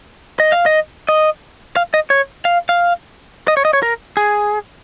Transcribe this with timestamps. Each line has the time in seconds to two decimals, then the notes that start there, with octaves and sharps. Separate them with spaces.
0.40 D#5
0.52 F5
0.66 D#5
1.09 D#5
1.76 F5
1.94 D#5
2.10 C#5
2.45 F5
2.69 F5
3.48 D#5
3.57 C#5
3.65 D#5
3.73 C#5
3.83 A#4
4.17 G#4